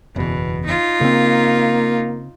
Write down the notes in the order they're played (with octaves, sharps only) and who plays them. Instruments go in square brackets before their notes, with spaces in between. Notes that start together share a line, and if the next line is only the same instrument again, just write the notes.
[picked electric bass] F#1 E2 [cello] B2
[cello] D#4 F4
[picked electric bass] C#3 C4 [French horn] A#3